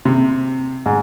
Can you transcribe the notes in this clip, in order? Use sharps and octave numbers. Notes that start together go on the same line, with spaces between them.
C3
G#2